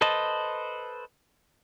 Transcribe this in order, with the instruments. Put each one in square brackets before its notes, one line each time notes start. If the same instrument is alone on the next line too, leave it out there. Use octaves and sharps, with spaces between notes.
[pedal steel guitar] A4 B4 C5 D#5 A5